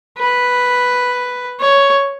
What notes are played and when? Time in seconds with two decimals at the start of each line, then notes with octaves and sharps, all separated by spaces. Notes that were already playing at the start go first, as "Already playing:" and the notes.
0.18 B4
1.60 C#5